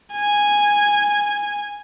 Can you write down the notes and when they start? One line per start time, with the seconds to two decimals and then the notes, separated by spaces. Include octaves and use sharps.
0.12 G#5